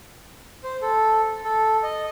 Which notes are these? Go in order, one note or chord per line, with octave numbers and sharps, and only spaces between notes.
C5
A4
A4
D#5